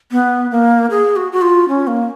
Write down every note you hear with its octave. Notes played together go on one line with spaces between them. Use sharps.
B3
A#3
G#4
F#4
F#4
F4
C#4
A#3